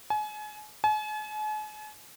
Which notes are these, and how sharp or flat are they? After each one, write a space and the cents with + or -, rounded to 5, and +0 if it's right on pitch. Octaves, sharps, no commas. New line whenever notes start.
G#5 +35
G#5 +45